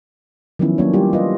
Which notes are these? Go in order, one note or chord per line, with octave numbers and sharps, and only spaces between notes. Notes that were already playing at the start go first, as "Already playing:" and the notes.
D#3 F3 F#3 B3 C#4 E4
F#3 A#3 C#4 D4 C#5
G3 E4 F4 G4
F4 B4 D#5